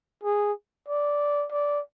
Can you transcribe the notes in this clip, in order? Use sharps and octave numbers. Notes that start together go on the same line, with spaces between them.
G#4
D5
D5